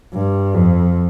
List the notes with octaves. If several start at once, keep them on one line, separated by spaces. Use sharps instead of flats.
G2
F2